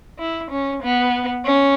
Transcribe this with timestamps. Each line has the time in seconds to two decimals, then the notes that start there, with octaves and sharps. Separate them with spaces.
0.19 E4
0.51 C#4
0.82 B3
1.45 C#4